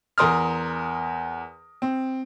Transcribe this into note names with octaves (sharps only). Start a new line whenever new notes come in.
E2 A#4 C6 D#6 F6
C4